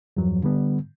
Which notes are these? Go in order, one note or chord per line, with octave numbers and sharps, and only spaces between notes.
E2 G2 F3 F#3
D3 G3 B3